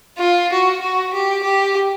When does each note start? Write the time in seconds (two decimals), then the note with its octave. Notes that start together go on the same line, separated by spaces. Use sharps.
0.19 F4
0.50 F#4
0.81 F#4
1.13 G4
1.43 G4